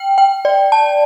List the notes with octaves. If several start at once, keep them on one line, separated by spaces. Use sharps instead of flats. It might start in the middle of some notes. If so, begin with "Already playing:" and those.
Already playing: G5
G5
D5
A5